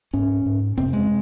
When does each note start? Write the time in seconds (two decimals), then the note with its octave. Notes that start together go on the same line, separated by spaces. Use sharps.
0.14 G#2 C#4
0.46 G#2
0.78 F2 C3 C4
0.93 G#3